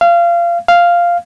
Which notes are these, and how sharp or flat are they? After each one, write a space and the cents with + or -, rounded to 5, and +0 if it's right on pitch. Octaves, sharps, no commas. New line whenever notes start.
F5 -25
F5 -5